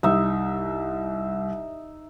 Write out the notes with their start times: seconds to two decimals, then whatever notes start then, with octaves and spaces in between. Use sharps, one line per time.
0.03 C2 D#4 E5